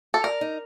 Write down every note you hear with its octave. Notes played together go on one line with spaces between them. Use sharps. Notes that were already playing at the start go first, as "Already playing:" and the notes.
A4
A#4 D5
D#4